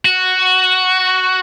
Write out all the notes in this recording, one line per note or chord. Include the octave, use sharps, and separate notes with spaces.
F#4